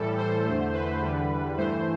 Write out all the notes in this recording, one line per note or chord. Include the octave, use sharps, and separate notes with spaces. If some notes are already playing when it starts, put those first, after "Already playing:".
Already playing: A2 E3 G3 A4
C5
E2 D3 A3
B4
E2 D3 G3
G2 E3 A3 C5